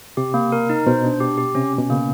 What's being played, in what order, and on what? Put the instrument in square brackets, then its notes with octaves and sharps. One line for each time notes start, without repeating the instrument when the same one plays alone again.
[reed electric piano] C3 [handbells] G4
[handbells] A#3
A#4
D#4
[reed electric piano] B2 [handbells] C5
[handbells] D4
G4
G4
[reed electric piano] C3 [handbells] C#4
[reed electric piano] B2 [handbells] C#4
[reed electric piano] C#3 [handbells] A#3